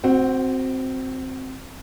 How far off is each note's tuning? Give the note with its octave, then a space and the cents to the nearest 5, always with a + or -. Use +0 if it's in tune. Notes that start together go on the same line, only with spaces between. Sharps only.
C4 +0 F#4 +0 F#5 +45